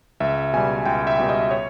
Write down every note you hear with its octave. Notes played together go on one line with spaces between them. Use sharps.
C#2 E5
B2 G3 G#5
C#2 G5
E5
B2 G3
D#5
C#5